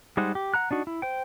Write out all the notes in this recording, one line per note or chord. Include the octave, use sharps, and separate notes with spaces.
G3 G#3 D#4 C5 F#5
G4
F#5 A#5 F#6
D4 D#4 F#4
E4
C5 G5